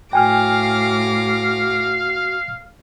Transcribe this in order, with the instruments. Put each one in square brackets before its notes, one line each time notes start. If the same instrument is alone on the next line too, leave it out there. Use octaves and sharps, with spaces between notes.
[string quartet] A2 D6 A#6 [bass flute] F#4 [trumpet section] F5 [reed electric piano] G5 G#5 F6